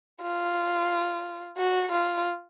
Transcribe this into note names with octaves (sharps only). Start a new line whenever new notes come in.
F4
F#4
F4